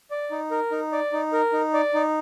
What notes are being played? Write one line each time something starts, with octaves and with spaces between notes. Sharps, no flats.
D5
D#4
A#4
D#4
D5
D#4
A#4
D#4
D5
D#4